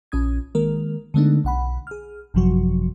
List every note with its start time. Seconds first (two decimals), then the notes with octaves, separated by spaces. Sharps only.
0.12 A#1 C#4 D#6 G#6
0.55 D#3 G#3 A#3 A#4
1.14 D3 G#3 A3 B3 D4 D#4
1.44 B1 F#5 B5
1.87 G#4 F6
2.34 G#1 F#2 C3 F3 F#3 F#4